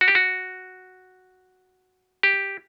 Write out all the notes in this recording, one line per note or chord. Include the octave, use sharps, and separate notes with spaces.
F#4
G4
F#4
G4